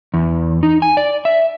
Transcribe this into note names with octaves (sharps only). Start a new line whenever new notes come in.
E2
D#4
G#5
D5
E5